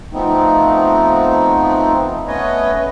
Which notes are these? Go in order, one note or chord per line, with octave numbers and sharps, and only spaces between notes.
F3 A3 B3 C4 D#4
A3 B3 C#4 B4 C#5 D#5